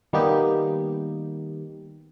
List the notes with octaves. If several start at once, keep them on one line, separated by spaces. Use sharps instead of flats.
D#3 G3 A#3 B3 D#4 G4